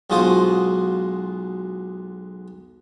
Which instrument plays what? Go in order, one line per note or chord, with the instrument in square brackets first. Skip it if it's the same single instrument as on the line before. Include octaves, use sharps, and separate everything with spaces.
[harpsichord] B1 G#3 F4 F#4 C5 D#6